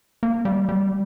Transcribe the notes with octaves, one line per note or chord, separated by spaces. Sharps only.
A#3
G3
G3